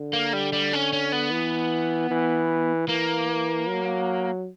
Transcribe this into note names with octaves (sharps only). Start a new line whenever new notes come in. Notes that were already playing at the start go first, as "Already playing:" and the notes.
Already playing: D3
A#3
G3
G3
C#4
C#4
B3
E3
E3
E3 A#3
F#3